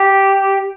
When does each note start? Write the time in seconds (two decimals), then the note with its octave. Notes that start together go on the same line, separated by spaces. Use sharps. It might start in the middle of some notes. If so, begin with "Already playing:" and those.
Already playing: G4